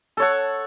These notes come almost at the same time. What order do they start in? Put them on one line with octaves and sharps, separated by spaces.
A4 C#5 F#5